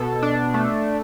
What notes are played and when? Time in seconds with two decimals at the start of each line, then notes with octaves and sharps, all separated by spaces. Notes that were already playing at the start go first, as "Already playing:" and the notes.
Already playing: B2 A4
0.23 D4
0.54 A3